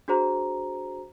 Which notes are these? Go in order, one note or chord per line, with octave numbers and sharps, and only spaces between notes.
D4 F#4 G#4 C5 A#5